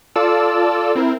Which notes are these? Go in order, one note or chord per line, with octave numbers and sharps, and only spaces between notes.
F4 A4 D5 A5 E6
C4 E4 A#4